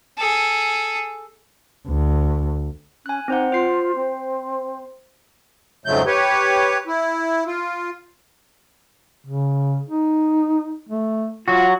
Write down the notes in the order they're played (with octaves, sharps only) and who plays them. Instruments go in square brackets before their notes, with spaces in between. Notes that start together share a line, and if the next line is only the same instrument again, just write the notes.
[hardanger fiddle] G#4 A4
[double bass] D2
[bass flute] C#4 [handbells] G#5 F#6
[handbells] C4 C5 F#5 [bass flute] D#4
[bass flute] F4 [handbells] C5 C7
[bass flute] C4
[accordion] F2 G#2 C#3 F#3 A3 G6
G4 B4 C#5
E4
F4
[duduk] C#3
D#4
A3
[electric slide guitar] F#3 F#4 [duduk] F4